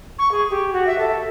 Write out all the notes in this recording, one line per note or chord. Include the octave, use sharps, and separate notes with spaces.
C#6
G#4
G4
F#4
E5
A4